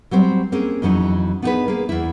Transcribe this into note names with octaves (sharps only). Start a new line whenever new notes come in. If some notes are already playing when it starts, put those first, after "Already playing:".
F#3 G3 C4 C5
A#3 C4 C#4 G#4
F2 E3 F#3 C#4 D#4
B3 D4 D#4 F#4 G#4 B4
A#3 G#4
E2 E4